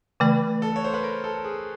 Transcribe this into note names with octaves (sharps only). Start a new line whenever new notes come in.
C#3 E3 A3 B4
A4
C#5
C5
B4
A#4
A4
G#4